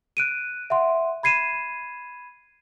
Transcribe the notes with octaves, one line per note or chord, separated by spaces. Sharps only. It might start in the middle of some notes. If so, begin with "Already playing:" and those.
F#6 D7 D#7
E5 F#5 C6
B5 G#6 C7 D#7 E7